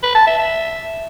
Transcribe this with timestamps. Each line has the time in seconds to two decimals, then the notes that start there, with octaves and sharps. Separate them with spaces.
0.03 B4
0.15 A5
0.27 E5
0.39 E5